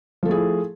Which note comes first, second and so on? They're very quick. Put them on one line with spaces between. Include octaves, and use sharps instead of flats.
F3 A4 A3 G#4 E4